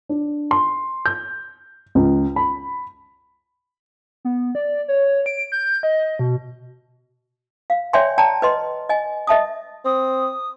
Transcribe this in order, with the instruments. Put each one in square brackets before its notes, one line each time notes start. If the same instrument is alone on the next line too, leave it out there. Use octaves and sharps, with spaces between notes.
[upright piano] D4
C6
G6
C#2
B5
[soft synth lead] B3
D5
C#5
D7
G6
D#5
B2
[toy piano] F5
C#5 D5 E5 G5 G#5 C6
D5 G5 A5 A#5
B4 D#5 C6
D#5 G#5
D#5 E5 A5 D#6
[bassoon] C4 [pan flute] D#6